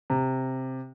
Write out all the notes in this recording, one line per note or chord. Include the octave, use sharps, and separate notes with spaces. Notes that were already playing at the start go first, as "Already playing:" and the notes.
C3